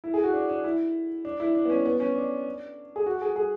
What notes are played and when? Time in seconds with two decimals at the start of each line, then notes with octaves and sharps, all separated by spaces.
0.04 E4
0.14 G#4
0.24 F#4
0.34 D4
0.49 D4
0.64 E4
1.25 D4
1.40 E4
1.55 D4
1.65 B3
1.70 C#4
1.85 B3
2.00 C#4
2.15 D4
2.96 G#4
3.06 F#4
3.22 G#4
3.36 G#4